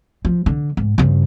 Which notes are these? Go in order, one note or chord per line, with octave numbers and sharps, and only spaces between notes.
F3
D3
G#2
G2 C#3